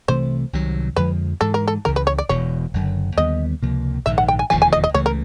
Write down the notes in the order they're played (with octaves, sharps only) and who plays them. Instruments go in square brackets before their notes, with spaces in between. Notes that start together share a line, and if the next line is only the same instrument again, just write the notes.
[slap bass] C2 C3 E3 A3 [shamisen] C5
[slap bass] C2 C3 D#3 F#3
[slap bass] F2 D3 F3 G#3 [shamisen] B4
[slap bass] G#2 E3 G#3 [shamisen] A4
[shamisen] A#4
A4
[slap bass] C#2 C#3 E3 [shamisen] A#4
[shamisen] B4
C#5
D5
[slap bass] E1 E2 B2 [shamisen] C#5
[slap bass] F#1 F#2 D3
[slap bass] D#2 D3 G3 B3 [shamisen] D#5
[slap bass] C#2 C3 F3 A#3
[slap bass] A#1 G#2 D#3 [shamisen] E5
[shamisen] F#5
G5
G#5
[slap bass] E1 D#2 D3 F3 [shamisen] G#5
[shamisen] G#5
D#5
D#5
[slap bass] C#2 C#3 E3 A3 [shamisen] C#5
[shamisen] A#4